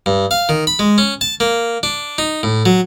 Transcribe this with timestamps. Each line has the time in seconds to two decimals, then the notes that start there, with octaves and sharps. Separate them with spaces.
0.06 G2
0.31 F5
0.49 D#3
0.67 B5
0.79 G#3
0.98 C#4
1.21 A5
1.40 A#3
1.83 D4
2.18 D#4
2.43 A2
2.66 F#3